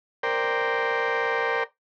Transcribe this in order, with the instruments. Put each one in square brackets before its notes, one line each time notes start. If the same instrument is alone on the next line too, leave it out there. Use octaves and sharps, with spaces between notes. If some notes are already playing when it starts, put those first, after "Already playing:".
[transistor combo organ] A#4 C5 D5 G5